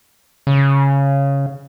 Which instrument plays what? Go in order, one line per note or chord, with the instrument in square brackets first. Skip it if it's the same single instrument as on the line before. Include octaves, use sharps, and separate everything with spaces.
[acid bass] C#3